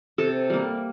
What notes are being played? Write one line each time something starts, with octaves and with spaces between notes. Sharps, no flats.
C3 A4
G3 A#3